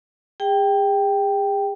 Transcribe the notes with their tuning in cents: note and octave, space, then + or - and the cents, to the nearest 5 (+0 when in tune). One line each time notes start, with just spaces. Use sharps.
G#4 -40 G5 +0